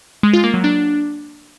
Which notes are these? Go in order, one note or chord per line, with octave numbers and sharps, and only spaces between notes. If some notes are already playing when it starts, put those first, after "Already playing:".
G#3
F4
A#3
F#3
D4